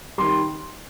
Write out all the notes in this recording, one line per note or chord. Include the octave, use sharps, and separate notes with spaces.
D#3 G3 C6